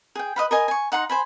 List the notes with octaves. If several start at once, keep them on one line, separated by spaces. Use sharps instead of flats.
G#4 G5
B4 D#5 F5 B5
A#4 D#5 G#5
G#5 C#6
D#4 F#5 A#5 C6
C5 G#5 B5